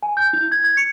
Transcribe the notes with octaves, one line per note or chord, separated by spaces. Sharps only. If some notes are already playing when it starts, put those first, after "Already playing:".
G#5
G6
E4
G#6
G#6
C#7